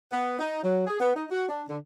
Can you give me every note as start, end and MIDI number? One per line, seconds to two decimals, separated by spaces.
0.12 0.36 59
0.39 0.63 63
0.63 0.86 54
0.86 0.96 68
1.00 1.12 59
1.15 1.25 63
1.31 1.47 66
1.48 1.63 62
1.68 1.77 50